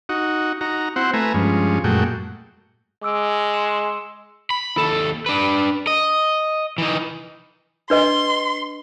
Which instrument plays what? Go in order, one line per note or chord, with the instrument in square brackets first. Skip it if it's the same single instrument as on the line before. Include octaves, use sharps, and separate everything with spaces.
[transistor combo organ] D#4 F#4
D#4 F#4 A#5
C4 E4 F#4 C5 F#5
A3 B4 E5 G#5 A#5
G2 F3 G#3 C#4
F#2 A#2 G#3 A3 F#4 G5
[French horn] G#3 [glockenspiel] D6 E6 D7
[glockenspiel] C6 C#7 E7
[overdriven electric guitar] B5
D#2 A4
D4 B4
D#5
E3 D#4
[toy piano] D4 B4 D#5 [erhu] C6